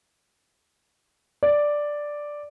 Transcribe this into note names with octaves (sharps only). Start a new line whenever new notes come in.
D5